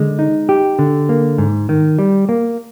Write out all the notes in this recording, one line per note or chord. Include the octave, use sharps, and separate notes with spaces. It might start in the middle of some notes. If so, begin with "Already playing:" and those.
Already playing: D3 G#3
D#4
G4
D3
A#3
G#2
D#3
G3
A#3